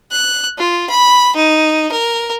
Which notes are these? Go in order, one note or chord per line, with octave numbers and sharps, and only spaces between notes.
F#6
F4
B5
D#4
A#4